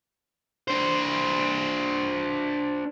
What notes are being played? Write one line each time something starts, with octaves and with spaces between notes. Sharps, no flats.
D4 C5